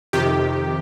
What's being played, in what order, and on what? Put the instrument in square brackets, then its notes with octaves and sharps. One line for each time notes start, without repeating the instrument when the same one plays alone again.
[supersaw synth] F2 C3 D#3 G4